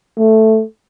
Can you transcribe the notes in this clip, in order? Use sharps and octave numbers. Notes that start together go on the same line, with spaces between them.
A3